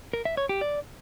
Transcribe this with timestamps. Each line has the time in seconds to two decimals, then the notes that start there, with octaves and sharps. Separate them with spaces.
0.13 A#4
0.25 E5
0.37 C#5
0.49 G4
0.61 D5